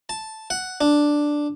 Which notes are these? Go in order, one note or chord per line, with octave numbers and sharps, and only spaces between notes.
A5
F#5
D4